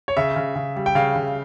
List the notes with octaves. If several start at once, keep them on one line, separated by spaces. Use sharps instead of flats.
C#5
C#3 E5
C#3
C#3
G3
G5
C#3 F5
C#3